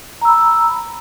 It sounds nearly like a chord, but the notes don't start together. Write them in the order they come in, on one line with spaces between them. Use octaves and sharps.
A#5 E6 B5